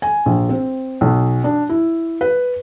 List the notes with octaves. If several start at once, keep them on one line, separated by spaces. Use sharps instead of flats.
G#5
A#1
C4
B1
D4
E4
B4